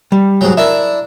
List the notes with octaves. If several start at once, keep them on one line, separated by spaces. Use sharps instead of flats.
G3
G#2 F#3
D4 E4 A#4 E5